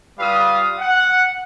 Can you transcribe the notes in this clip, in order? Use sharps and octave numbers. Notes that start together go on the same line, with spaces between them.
G3 F4 B4 F5 D#6
F#5